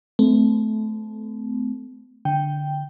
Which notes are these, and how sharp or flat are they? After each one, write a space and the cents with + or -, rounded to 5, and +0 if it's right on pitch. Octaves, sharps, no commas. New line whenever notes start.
A3 -20 C4 -40
D3 +0 G5 +0